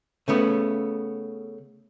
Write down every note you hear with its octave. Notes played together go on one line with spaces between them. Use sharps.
C#3 A3 B3